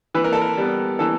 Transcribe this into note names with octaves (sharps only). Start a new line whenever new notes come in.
E3 B4
A#4
A4
A#4
G3 B3
E3 A4